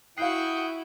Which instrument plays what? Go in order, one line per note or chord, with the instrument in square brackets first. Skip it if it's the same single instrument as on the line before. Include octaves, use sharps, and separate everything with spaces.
[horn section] E4 [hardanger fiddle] F#4 G5 [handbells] F5 C7 [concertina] D#6 F#6